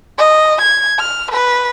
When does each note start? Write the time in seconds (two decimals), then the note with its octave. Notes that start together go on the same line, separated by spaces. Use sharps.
0.19 D#5
0.62 G#6
0.99 F6
1.32 B4